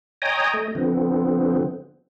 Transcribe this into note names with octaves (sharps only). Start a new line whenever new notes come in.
C#5 D#5 G5 G#5 A#5 D#6
A3 D#5
D3 F3 B3 C4